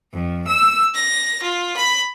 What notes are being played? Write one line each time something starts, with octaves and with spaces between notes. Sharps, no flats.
F2
E6
A#6
F4
B5